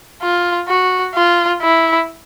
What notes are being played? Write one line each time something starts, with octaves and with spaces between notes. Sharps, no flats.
F4
F#4
F4
E4